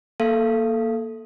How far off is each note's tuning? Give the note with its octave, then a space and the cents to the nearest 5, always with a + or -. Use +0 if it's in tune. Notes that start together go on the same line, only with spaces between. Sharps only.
A#3 +0 A4 +0 F5 -25